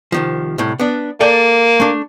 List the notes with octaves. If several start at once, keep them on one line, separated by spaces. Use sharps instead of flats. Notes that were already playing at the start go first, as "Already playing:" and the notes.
C2 D#3 F3
C2 A2
B3 D4
A#3 A4 D5 G5
A3 D4